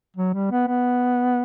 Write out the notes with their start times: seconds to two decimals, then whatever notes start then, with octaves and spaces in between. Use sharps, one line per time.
0.17 F#3
0.34 G3
0.51 B3
0.68 B3